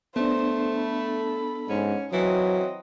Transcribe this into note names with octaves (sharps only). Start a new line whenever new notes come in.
A3 B3 D4 C5
A4 B5
G#2 C#4
E3 F#3 C4 D#5